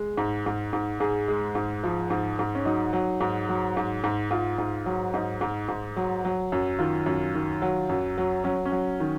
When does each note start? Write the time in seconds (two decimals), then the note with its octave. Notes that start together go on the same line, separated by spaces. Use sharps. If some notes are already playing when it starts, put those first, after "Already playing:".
Already playing: G#3
0.17 G#2
0.46 G#2
0.73 G#2
1.00 G#2 G#4
1.28 G#3
1.55 G#2
1.84 F3
2.10 G#2
2.39 G#2
2.55 C#4
2.65 F#3 D#4
2.93 F#3
3.20 G#2
3.49 F#3
3.77 G#2
4.04 G#2
4.31 G#2 F4
4.58 G#2
4.86 F#3
5.14 G#2 D#4
5.41 G#2
5.68 G#2
5.96 F#3
6.25 F#3
6.52 F#2
6.79 D#3 F4
7.06 F#2
7.35 D#3
7.62 F#3
7.89 F#2
8.18 F#3
8.44 F#3 C#4
8.65 C#4
8.72 F#3
9.00 D#3